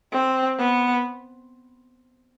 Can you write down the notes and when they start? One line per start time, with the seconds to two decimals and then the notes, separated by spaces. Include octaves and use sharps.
0.13 C4
0.59 B3